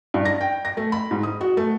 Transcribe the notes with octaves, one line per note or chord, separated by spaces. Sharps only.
G2
A#6
G5
A#6
A3
B5
G#2
D#6
F#4
A3